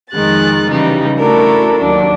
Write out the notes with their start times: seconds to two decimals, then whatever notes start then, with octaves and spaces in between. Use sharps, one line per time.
0.11 F2 D#3 G#3 F#6 A6
0.69 C#3 E3 G3 D#4
1.18 A3 D4 E4 F#4 A4 A#4
1.79 D#2 F#3 D4